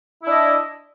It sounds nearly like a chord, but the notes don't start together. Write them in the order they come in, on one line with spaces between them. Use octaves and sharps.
E4 D4 D#5